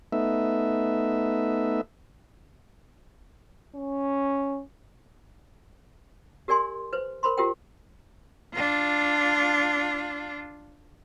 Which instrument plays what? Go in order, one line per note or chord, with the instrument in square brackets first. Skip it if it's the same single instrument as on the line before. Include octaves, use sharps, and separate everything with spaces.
[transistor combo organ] A3 B3 D#4 E5
[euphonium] C#4
[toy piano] G4 A#4 D5 G#5 C6
B4 C5
A#4 C5 B5 C6
F4 G4 A#4 C5 G5
[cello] D4 F4